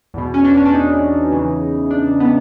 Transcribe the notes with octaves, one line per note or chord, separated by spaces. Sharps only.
E2 B2
C#4
D4
C#4
D4
D#4
E2 C#3 E3
D4
B3